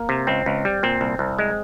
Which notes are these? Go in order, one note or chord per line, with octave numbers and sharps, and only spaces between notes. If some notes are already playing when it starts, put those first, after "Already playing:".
Already playing: A#3
C3
C#2 C4
C#2
G3
A#2 C4
C2
C2
G#3